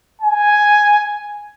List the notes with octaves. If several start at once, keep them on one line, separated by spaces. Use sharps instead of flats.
G#5